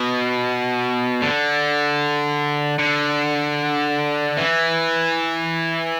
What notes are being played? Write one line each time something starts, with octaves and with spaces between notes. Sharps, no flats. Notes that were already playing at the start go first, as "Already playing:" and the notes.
Already playing: B2
D3
D3
E3